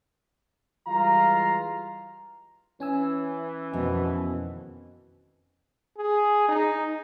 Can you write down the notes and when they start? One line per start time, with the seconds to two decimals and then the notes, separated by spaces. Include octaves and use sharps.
0.87 E3 G3 G#3 F4 F5 A#5
2.80 E3 C#4 G#5 E6
3.73 F2 B2 D#3 G#3
5.98 G#4
6.49 D#4